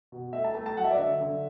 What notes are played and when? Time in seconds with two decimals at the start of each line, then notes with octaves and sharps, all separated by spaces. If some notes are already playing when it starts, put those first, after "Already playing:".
0.12 B2
0.33 A3 E5
0.44 A5
0.54 A3 A5
0.66 A5
0.77 F#3 F#5
0.84 E5
0.91 D5
0.97 D3 E5
1.20 D3